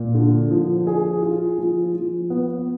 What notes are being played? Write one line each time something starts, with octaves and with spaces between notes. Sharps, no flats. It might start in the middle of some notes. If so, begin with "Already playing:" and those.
Already playing: A#2
D3
F3
G#4
F4
F3
F3
B3